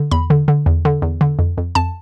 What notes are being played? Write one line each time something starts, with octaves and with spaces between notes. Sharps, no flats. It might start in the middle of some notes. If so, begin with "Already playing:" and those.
Already playing: D3
E2 B5
D3
D3
E2
D3
E2
D3
F2
F2
F2 A5